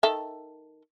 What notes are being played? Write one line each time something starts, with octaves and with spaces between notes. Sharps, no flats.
D#3 A4 E5